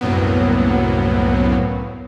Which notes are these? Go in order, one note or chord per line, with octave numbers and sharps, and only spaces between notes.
C2 F#2 A2 F#3 A#3 B3